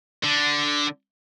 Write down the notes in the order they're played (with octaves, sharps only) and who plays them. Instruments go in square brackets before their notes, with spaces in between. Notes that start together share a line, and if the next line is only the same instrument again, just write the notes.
[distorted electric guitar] D3